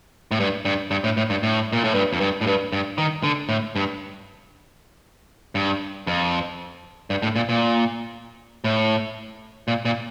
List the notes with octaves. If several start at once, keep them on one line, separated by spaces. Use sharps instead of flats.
A2
G2
G2
G2
A2
A2
G2
A2
A#2
A2
G2
F2
G2
A2
G2
G2
D#3
D3
A2
G2
G2
F2
G2
A2
A#2
A#2
A2
A#2
A#2